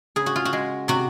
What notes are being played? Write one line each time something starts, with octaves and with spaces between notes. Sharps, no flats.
C#3 G#4
F#4
F4
F#4
G#3
C3 F#4